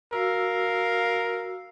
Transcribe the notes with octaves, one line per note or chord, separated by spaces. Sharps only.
F#4 A#4 F5 E6